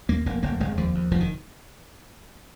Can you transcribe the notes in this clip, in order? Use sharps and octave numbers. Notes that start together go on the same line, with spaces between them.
D#2 A#3
F1 A#3
F1 A#3
F1 G#3
D#2 F3
D#2
F1 F3
D#3